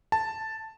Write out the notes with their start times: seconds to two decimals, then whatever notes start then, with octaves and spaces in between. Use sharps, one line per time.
0.12 A5